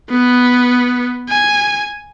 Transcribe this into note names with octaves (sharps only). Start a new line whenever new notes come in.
B3
G#5